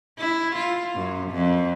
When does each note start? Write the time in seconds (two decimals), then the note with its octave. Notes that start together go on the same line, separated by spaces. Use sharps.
0.19 E4
0.56 F4
0.96 F#2
1.32 F2